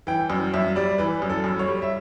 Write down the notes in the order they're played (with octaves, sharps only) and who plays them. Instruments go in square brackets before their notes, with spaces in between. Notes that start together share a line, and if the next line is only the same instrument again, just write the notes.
[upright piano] E3 G5
F#2
F#2 E5
G3 D5
E3 B4
F#2
A4
F#2
C#5
G3
E5